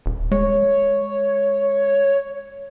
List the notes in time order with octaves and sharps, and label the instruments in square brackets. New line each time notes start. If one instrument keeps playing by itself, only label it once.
[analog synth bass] D#1
[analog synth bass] G#3 [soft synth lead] C#5